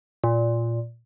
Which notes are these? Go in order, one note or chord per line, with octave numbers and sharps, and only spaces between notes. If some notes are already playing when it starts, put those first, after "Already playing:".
A#2